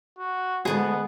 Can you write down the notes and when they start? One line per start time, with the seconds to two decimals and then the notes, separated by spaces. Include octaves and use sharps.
0.18 F#4
0.65 D2 D3 G#3 B3 G#4